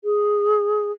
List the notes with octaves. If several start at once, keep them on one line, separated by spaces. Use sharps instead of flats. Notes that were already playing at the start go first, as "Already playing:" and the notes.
G#4